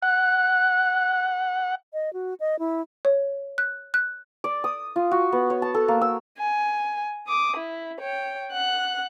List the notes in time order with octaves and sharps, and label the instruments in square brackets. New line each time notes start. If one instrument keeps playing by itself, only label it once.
[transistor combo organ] F#5 [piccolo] F#6
[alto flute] D#5
F#4
D#5
E4
[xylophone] C#5
F#6
F#6
[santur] D5
D#6
F4
F#4
B3
C#5
A5
A4
A#3
E6
[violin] G#5
D6 D#6
E4
C#5 G5
F#5 F#6